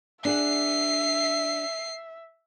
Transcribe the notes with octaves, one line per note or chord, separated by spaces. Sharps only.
D4 G#4 E5 F#5 C7